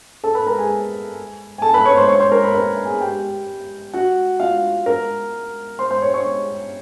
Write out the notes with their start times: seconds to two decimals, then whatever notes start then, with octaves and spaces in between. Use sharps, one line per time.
0.24 A4 A5
0.35 B4 B5
0.47 A#4 A#5
0.58 G#4 G#5
1.58 G#5
1.62 A4 A5
1.74 B4 B5
1.86 C#5 C#6
1.96 C5 C6
2.08 C#5 C#6
2.20 C5 C6
2.32 A#4 A#5
2.43 B4 B5
2.54 A#4 A#5
2.85 G#4 G#5
3.01 G4 G5
3.94 F#4 F#5
4.40 F4 F5
4.86 A#4 A#5
5.79 C5 C6
5.91 C5 C6
6.02 C#5 C#6
6.13 C#5 C#6